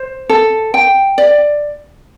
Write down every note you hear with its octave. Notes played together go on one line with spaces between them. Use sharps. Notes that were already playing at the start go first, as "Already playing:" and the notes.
Already playing: C5
A4
G5
D5